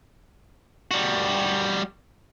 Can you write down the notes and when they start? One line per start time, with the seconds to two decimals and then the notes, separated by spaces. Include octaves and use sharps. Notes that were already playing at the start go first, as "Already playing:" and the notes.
0.91 G3 F#4